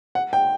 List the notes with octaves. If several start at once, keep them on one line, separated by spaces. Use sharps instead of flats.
F#5
G5